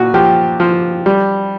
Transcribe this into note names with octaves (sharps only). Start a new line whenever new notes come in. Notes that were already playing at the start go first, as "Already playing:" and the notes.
Already playing: A#2 F#4
F3 G4
F3
G3